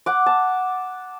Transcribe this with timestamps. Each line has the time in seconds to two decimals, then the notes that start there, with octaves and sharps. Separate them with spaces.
0.06 F#5 D6
0.26 A5